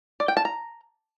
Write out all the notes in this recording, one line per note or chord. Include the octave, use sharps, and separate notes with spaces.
D5
G5
A5
A#5